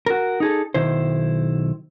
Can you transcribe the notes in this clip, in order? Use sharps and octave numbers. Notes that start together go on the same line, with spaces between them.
F#4 A#4
D#4 G#4 A4
B1 D#3 E4 C5